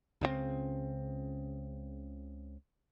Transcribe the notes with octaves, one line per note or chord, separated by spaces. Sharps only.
C#2 C#3 E3 C4